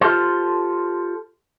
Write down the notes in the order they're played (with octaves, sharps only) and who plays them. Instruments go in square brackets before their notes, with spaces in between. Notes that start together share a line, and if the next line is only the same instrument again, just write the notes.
[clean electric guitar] F4 G4 A4 C5